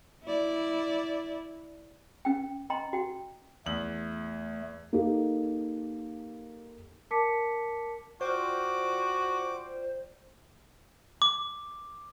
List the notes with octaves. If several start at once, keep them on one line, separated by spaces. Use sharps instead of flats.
E4 D5
C#4 G5
D#5 G5 A#5 C6
F#4 G5
E2 A3 F#7
A#3 D#4 G4 A4
A#4 A5 D6 B6 C#7
F4 F#4 C5 D5 G5 D6
D6